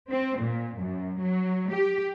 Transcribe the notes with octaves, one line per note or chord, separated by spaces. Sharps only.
C4
A#2
F#2
F#3
G4